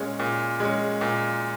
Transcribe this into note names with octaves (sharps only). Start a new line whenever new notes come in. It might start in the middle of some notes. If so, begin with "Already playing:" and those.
Already playing: A#2 G#3 C#4
A#2
G#3 C#4
A#2